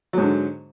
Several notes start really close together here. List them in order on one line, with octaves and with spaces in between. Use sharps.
F#3 G#2 D3